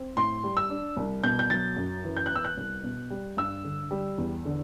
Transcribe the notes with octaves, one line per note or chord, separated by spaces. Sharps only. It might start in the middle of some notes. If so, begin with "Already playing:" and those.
Already playing: C4
A2 C6
G3
E6
D4
C2
B2 G6
G6
F#3 A6
F#2
E3
G6
F#6
B3 E6
F#6
C2
B2
G3
G2 E6
D3
G3
E2
D3